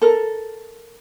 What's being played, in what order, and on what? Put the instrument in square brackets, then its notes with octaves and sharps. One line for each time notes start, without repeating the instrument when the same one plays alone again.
[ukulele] A4 A#4